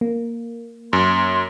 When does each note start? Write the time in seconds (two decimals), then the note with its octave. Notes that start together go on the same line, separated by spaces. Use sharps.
0.01 A#3
0.93 F#2 C6